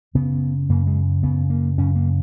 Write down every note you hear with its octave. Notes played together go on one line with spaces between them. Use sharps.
F#2 C#3 B3
F#2 C#3 A#3
G#3
F#2 C#3 B3
A#3
F#2 C#3 C#4
A#3